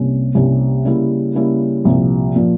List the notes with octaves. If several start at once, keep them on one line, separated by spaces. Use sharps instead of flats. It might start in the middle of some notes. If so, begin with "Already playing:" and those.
Already playing: C2 C3 G3 A#3 C#4
C2 C3 G3 A#3 C#4
C#3 G3 A#3 E4
C#3 G3 A#3 E4
C2 A#2 F3
A#2 F3